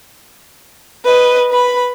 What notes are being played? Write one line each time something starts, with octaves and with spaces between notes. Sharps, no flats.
B4 D#5
B4 B5